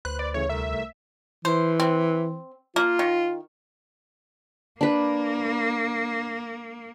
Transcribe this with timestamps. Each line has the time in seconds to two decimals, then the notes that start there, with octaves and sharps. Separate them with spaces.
0.05 D2 B4 C5 F#6
0.19 D5
0.34 C#3 E3 A3 C#5
0.49 C2 A3 A#4 E5
1.45 E3 C5
1.80 C4
2.76 A#3 F4
2.99 D#3
4.81 A#3 D4 B4